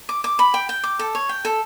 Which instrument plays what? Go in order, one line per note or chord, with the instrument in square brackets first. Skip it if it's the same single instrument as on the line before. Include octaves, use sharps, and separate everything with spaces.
[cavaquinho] D6
D6
B5
G5
G5
D6
A4
C#5
G5
A4